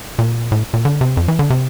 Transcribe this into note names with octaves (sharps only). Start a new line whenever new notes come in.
A#2
A2
A#2
D3
C3
F2
E3
D3
C3